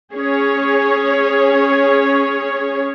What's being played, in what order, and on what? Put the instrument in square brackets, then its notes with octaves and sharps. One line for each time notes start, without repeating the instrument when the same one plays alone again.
[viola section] C#4 G#4 C#5